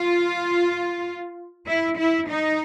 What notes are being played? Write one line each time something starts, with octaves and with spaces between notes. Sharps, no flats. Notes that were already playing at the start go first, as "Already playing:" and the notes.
Already playing: F4
E4
E4
D#4